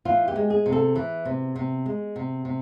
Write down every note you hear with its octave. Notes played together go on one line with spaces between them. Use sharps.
E3 F4
G4
G#3
G#4
C3
A4
E3
C3
C3
G#3
C3
C3